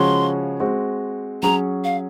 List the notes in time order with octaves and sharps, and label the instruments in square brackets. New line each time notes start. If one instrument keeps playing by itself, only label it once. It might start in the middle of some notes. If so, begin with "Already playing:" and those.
Already playing: [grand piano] C#3 F3 G#3 C#4 F#4 [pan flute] C6
[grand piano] G#3 C4 F#4
[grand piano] F#3 C#4 G#4 [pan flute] A#5
[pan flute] F5